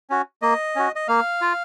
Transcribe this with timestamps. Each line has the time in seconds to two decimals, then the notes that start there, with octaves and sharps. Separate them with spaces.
0.10 C#4 F#4
0.42 A#3 D#5
0.76 C#4 F#4
0.96 D#5
1.08 A#3 F5
1.41 F4